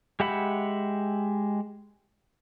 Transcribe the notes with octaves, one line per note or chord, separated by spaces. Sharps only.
G#3 G4 E5 F#5 B5